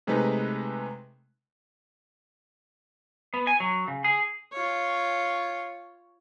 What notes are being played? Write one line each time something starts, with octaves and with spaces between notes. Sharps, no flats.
C3 G#3 A3 D#4 B4
B3
G#5
F#3
C#3
G#4
F4 C#5